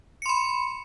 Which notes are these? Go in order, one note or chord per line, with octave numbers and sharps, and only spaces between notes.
B5 C6 C#7